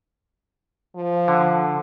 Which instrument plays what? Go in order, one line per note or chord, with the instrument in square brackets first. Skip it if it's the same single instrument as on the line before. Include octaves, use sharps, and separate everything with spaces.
[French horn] F3
[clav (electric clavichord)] D3